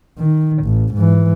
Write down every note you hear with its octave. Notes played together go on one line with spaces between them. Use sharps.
D#3
A1
G#2 E3